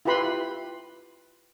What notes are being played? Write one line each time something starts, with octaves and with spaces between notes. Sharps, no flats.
E4 F4 G4 B4 B5 C6